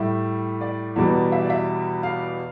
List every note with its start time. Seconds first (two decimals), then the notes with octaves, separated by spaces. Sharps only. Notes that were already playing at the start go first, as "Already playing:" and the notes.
Already playing: A2 G3 E5
0.61 D5
0.96 E2 B2 G3
1.32 E5
1.45 D5
1.50 E5
2.03 F5